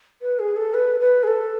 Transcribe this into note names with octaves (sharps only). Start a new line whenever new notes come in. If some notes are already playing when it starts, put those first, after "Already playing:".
B4
G#4
A4
B4
B4
G#4
A4